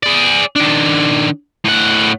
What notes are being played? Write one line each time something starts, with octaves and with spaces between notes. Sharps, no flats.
G#4 D5
D#3 D4
A2 F#5